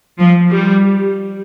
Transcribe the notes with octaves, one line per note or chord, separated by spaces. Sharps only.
F3
G3